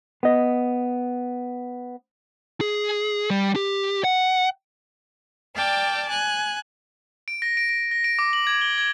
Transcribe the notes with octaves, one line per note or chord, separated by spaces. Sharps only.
B3 D#5
G#4
G3
G4
F#5
D5 G5 A5 D6 F6
G#5 F#6
D7
A#6
D7
D7
A#6
D7
D6
F#7
G#6
G7
G#6